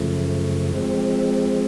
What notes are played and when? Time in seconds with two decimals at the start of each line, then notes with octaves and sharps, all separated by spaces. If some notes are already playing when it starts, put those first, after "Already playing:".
Already playing: F#2 C#3 F3 A3
0.73 F3 G#3 C4